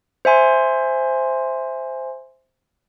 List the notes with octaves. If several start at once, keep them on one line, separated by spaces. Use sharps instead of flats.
C5 E5 G#5 C6